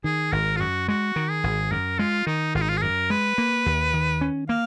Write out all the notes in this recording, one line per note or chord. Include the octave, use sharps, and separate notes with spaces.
D#3 G#4
G#1 A#4
F4
F#2 F#4
G#3 F#4
D#3
G#4
G#1
F#2 A#4
G#3 F4
D#3 D#4
G#1 F4
D#4
F4
G#4
F#2 A#4
G#3 B4
A#3
D#2
D#3
C#4
A#3 F5